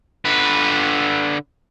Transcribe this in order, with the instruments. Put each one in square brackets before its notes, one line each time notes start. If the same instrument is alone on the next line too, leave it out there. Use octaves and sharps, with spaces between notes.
[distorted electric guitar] D3 B4